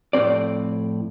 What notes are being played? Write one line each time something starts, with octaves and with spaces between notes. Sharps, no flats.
F2 A2 C4 D5